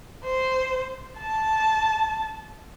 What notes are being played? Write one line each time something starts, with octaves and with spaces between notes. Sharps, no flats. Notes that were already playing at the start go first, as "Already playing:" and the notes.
C5
A5